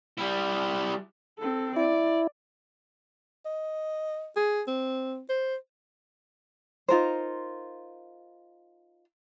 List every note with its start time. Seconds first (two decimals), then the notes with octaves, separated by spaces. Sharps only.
0.18 G3 E4
1.39 C4 A4
1.76 E4 D5
3.45 D#5
4.36 G#4
4.67 C4
5.29 C5
6.88 D#4 F4 A#4 C5